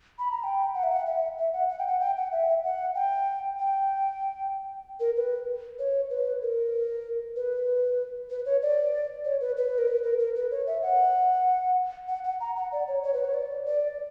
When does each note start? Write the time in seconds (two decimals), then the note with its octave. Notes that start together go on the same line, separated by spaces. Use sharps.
0.19 B5
0.31 A#5
0.44 G5
0.74 F#5
0.83 E5
0.92 F#5
1.06 E5
1.38 E5
1.53 F#5
1.69 F#5
1.79 G5
1.87 F#5
2.00 G5
2.17 F#5
2.32 E5
2.64 F#5
2.95 G5
3.59 G5
5.00 A#4
5.16 B4
5.79 C#5
6.10 B4
6.42 A#4
7.36 B4
8.30 B4
8.46 C#5
8.62 D5
9.25 C#5
9.41 B4
9.57 B4
9.78 A#4
9.88 B4
10.03 A#4
10.19 A#4
10.36 B4
10.51 C#5
10.67 E5
10.83 F#5
12.08 F#5
12.24 F#5
12.40 A#5
12.56 F#5
12.72 D5
12.88 C#5
13.03 C#5
13.14 B4
13.24 C#5
13.34 D5
13.66 D5